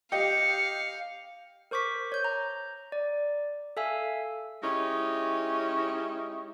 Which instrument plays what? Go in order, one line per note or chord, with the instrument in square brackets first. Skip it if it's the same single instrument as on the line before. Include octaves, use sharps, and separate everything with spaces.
[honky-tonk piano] G4 D#5 [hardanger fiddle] F5 [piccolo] C#7
[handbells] A#4 C5 C#6 D6 B6
C#5 G6
A#5
D5
A4 E5 F5 G#5 E6
[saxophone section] G#3 C#4 D#4 E4 G4